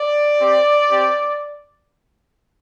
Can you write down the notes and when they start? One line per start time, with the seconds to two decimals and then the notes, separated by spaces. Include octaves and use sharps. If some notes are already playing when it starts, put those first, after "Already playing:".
Already playing: D5
0.38 C4 G4
0.89 C4 G4